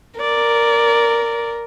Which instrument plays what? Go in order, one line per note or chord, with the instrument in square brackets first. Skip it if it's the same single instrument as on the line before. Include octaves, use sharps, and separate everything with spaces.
[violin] A#4 [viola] D5